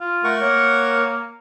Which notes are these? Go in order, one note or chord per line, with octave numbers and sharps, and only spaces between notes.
F4
A3 A#4 F#5 C#6
A#3 C#5